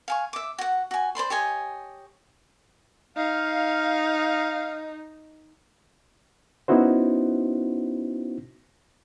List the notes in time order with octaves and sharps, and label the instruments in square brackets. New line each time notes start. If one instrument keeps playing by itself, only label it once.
[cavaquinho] F5 G#5 C#6
E5 D6
F#4 F#5
F#4 G#5
C5 D5 B5 C6
G4 C#5 D#5 G#5
[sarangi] D#4 [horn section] F5
[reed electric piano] B3 C#4 D#4 E4 F#4 C5